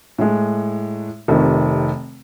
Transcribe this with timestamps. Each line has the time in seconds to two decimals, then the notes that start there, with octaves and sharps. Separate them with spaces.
0.18 A2 G#3
1.28 F1 C3 D#3